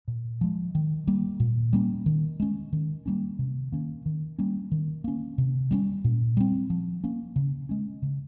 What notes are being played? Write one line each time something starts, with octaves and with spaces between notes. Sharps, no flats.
A#2
F3 G#3
D#3
G3 A#3
A#2
G3 A#3 C#4
D#3
G#3 C#4
D#3
G3 A#3 C#4
C3
D#3 A#3 C#4
D#3
G3 A#3 C#4
D#3
A#3 C#4
C3
G3 A#3 C#4
A#2
G3 C4
F3
A#3 C#4
C#3
G#3 C#4
C#3